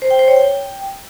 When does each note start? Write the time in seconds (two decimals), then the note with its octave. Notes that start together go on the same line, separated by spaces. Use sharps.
0.02 C5
0.11 G5
0.19 C5
0.28 C#5
0.36 G5